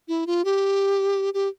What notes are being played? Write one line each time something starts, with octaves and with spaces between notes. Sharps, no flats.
E4
F4
G4
G4